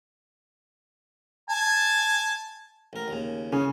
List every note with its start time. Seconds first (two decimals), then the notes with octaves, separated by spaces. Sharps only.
1.49 G#5 A5
2.93 A1 A#4
3.08 D#2 C#3
3.52 C#3 C#4